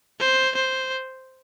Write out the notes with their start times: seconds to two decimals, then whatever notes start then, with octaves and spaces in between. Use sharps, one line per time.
0.20 C5
0.55 C5